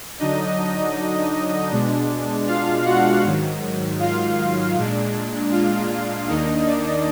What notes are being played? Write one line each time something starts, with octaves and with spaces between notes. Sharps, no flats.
D3 F#3 D4 D#4 D#5
B2 G#3 D4
F4 F5
F#4 F#5
G#2 D#3 F#3
F4 F5
A#2 G#3 D4
F4 F5
D#2 D#3 A#3 D4 D#4 D#5
D4 D5